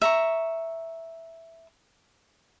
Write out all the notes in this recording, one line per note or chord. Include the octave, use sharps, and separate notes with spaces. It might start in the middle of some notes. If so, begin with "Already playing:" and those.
E5 A#5 C#6